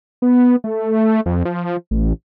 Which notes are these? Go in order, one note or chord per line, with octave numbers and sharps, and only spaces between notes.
B3
A3
F2
F3
A1